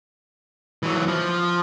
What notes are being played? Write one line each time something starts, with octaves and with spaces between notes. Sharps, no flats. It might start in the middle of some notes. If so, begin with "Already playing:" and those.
E3 F#3
F3